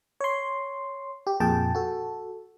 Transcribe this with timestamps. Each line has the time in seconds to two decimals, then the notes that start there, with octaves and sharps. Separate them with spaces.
0.20 C#5 C6
1.27 G4
1.40 F2 A#2 G#4 G5 A5
1.75 F#4 A4